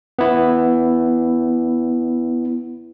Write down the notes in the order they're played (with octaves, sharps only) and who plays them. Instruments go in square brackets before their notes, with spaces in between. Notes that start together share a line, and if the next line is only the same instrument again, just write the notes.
[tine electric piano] B3 E4